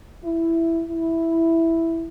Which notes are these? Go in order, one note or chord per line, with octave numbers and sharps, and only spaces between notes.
E4
E4